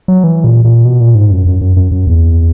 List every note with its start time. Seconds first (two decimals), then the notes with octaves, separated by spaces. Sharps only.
0.08 F#3
0.24 E3
0.44 A#2
0.65 A#2
0.85 B2
1.00 A#2
1.15 G#2
1.31 F#2
1.46 F#2
1.61 F#2
1.77 F#2
1.91 F#2
2.07 E2